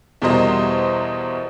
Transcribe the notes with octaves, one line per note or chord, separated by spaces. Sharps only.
E2 B2 G3 A#4 C5 D#5